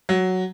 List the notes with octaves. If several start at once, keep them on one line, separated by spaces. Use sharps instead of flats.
F#3